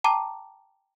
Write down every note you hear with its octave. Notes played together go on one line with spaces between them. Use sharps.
G5 A5 A#5 D6